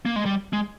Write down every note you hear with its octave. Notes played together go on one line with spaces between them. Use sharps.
A#3
G#3
G3
G#3